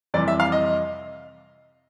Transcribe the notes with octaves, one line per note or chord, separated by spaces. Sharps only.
F2 C3 E3 G3 D5
E5
F5
D#5